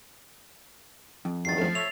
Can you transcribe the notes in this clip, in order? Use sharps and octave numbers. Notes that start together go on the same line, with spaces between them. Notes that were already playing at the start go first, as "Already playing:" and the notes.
F2
E2 G2 D#3 A6 C7
F3 A3
C#5 E5 F7